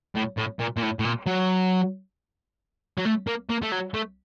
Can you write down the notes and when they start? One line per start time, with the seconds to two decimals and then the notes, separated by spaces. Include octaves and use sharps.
0.15 A2
0.37 A2
0.59 A#2
0.77 A#2
0.82 A2
0.99 A2
1.05 A#2
1.26 F#3
2.98 F#3
3.05 A3
3.27 A#3
3.50 A#3
3.62 A3
3.72 F#3
3.94 A3